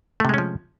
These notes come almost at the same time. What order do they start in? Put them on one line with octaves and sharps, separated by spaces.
A3 C3 G#3 C#4 F3